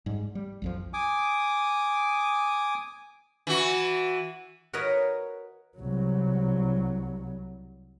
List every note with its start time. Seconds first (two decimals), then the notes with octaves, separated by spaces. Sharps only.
0.06 G#2 G3
0.35 G3
0.62 B1 F2 F3
0.94 G#5 D6 D#6
3.47 E3 F#4
4.73 F#4 A#4 B4 C#5 D#5
5.78 C2 F#3